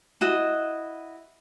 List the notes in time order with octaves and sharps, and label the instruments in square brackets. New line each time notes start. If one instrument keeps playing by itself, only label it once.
[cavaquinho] E4 F#4 D#5